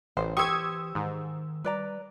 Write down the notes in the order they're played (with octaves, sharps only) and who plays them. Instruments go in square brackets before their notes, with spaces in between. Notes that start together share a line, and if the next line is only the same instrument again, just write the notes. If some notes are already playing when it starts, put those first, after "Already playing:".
[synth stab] A1 [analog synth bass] E3 [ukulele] C5
[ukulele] G4 C5 [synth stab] C#6 G#6 [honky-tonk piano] D#6 E6
[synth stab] G#2 [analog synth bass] D#3
[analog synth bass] G3 [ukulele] B4 D5 A#5